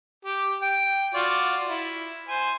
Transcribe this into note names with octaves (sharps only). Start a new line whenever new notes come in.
G4
G5
F4 F#4 D5
E4
C5 G#5